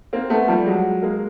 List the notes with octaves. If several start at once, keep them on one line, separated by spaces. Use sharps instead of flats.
A#3 C4
A3 B3
F3 G3
F#3 G#3
G#3 A#3